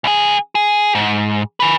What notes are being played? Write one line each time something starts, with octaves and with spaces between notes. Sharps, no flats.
C2 G#4
G#4
G#2
G#4 B4